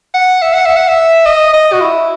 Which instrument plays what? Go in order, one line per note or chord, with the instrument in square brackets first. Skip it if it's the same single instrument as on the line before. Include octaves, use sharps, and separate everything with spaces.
[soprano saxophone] F#5
E5
F#5
E5
F#5
E5
D#5
D#5
F#4
E4